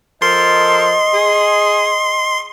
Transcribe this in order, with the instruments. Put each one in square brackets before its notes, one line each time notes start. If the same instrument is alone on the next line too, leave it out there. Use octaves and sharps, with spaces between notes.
[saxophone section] F3 A4 A#4 [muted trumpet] D#5 [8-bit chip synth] C6
[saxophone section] G#4